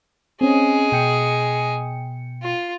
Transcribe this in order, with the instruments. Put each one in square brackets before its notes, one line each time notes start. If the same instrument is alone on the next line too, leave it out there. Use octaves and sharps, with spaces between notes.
[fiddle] G#3 G#4 [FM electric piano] C4 C#4
[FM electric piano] B2 G5 C#7
[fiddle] F4